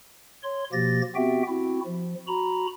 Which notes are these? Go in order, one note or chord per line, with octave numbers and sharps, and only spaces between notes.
C#5 C6
B2 F3 A#3 G4 A6 A#6
B3 C4 F#4 G4 E5 G5
C4 E4 F#4
F3
F#4 A#5 B5